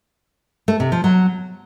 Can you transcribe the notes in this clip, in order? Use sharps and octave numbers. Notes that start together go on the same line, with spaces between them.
A3
C3
F3
F#3